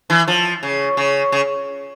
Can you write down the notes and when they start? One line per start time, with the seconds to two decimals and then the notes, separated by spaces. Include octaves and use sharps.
0.10 E3
0.28 F3
0.63 C#3
0.97 C#3
1.32 C#3